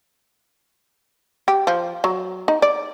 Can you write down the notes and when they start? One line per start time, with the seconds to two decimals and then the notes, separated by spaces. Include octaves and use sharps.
1.48 G4
1.67 F3
2.04 F#3
2.48 D#4
2.62 D5